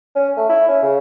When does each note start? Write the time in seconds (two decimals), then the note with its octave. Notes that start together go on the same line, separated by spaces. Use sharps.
0.16 C#4
0.37 A3
0.49 E4
0.68 C#4
0.83 C#3